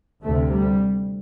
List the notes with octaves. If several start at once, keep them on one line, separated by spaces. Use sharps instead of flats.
D2 C3 A3
G3